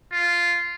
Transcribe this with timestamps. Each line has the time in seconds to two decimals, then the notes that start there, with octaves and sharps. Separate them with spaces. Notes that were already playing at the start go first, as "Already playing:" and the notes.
0.12 F4